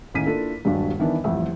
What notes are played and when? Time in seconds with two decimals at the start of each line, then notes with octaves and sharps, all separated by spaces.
0.14 D#2 A2 C#4 D#4 B6 D#7
0.26 A#3 D4 E4 F4 A4
0.65 D#1 G2 F#3 G#3 D4
0.99 D#3 E3 B3 D4
1.24 D#1 A1 F2 E5